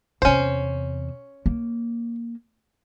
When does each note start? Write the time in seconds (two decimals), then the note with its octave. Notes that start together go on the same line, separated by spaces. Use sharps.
0.22 E2 C3 C#4 C5
1.46 A#3